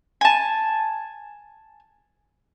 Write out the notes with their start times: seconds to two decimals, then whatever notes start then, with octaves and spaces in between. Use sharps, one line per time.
0.21 G#5 A5